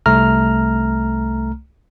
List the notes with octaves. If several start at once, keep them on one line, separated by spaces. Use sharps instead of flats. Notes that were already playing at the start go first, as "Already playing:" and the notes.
C2 A3 A#5 F6